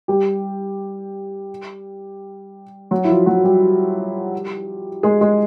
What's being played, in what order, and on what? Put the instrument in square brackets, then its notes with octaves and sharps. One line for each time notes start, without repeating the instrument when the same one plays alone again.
[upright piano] G3 G4
F#3 F#4
E4
F3 F4
F#3 F#4
G3 G4
G#3 G#4
G#3 G#4